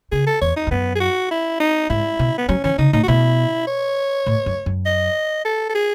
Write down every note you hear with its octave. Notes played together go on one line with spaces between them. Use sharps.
C#3 G#4
A4
E2 C#5
D#4
E2
F#2 B3
G#4
F#4
E4
D#4
G#2 E4
B2
B3
F#3 C#4
E3 C#4
C#3 D#4
A2 D#4
F#4
B2 E4
C#5
A2
F#2
F#2
D#5
A4
A4
G#4